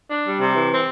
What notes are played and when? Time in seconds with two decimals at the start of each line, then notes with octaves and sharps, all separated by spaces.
0.09 D4
0.25 G3
0.39 C3
0.54 E3
0.69 C4